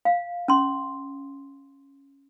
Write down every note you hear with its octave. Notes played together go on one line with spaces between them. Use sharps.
F5
C#4 C6